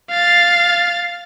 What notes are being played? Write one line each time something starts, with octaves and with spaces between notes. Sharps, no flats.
F5 A6